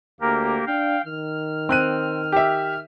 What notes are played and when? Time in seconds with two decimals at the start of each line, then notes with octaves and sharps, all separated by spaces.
0.21 D2 A#3 G4 A#4
0.67 D4 F5 G5
1.05 D#3 F6
1.69 C4 F#6 D#7
2.32 G4 E5